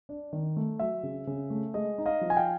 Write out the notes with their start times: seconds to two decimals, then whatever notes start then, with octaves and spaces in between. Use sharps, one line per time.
0.09 D4
0.33 D#3
0.57 A3
0.79 F#3 E5
1.03 C#3
1.27 C#3
1.50 A3
1.74 G#3 D#5
1.98 D#4
2.06 D#5 F5
2.21 F3
2.30 G#5
2.37 F5 G5